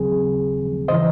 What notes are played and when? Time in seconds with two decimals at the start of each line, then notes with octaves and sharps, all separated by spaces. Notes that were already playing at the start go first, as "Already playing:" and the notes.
Already playing: D#2 C#3 F#3 C4 G#4
0.88 C#3 E3 C5 D#5